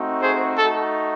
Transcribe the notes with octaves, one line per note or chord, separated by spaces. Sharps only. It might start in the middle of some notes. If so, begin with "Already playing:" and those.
Already playing: A3 C4 D#4 F#4
G#4 C5
A3 D#4 F#4 A4